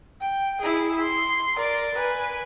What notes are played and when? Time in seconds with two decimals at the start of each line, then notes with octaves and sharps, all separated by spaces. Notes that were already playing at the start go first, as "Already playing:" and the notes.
0.21 G5
0.61 E4 G#4
1.01 C6
1.54 A#4 D5
1.95 B4 G#5